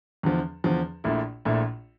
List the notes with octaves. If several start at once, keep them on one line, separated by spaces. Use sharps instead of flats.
E2 D3 F3
E2 D3 F3
A#1 A#2 A3 E4
A#1 A#2 A3 E4